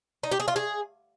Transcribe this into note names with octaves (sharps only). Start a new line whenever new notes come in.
D#4
G4
G#4
F4
G#4